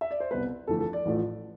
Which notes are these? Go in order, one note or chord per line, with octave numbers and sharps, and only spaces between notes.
E5
D5
C5
C2 B2 G3 B3 B4
G1 F2 E3 A3 A4
A4
D5
A1 A2 F3 A3